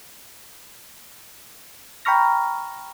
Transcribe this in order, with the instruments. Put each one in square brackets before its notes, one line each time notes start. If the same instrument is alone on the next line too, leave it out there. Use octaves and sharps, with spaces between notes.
[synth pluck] G5 A#5 B5 C#6 F6 A#6